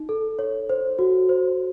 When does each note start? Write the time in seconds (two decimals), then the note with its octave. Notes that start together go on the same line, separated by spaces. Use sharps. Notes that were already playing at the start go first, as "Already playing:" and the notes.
Already playing: D#4
0.09 A4
0.39 C#5
0.69 C5
0.99 F#4
1.29 C5